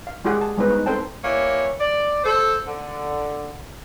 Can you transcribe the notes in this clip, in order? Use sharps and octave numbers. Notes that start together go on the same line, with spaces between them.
F5
G#3 F4 G4 G#4 F#5
A5
G3 G#3 B3 D#4 B4 C5
D#4
C4 A4 C5 G5 A5
E3 G3 A#3 C#5
D5
A4 C5
D3